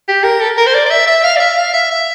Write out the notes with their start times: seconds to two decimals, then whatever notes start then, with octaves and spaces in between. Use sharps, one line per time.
0.08 G4
0.24 A#4
0.41 A4
0.58 A#4
0.66 C5
0.74 D5
0.86 D5
0.91 E5
1.07 E5
1.24 F5
1.36 D5
1.40 E5
1.58 F5
1.74 E5
1.91 E5